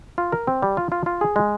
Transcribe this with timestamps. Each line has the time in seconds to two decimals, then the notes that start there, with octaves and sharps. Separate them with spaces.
0.18 F4
0.32 A#4
0.47 C4
0.62 G3
0.77 F4
0.92 F4
1.06 F4
1.21 G#4
1.36 G#3